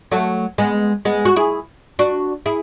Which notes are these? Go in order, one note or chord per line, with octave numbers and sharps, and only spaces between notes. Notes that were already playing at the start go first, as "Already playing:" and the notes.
F#3 A3
G#3 B3
G#3 B3
F#4
E4 G#4
D4 F#4
E4 G#4